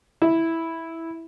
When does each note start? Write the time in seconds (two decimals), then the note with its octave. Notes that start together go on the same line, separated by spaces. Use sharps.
0.22 E4